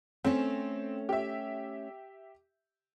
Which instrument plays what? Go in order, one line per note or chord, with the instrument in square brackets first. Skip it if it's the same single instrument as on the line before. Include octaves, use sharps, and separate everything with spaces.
[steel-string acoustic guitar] A3 C#4 [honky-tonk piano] C4
[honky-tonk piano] G4 E5